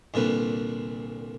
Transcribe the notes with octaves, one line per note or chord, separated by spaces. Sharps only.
C2 A#2 D3 B4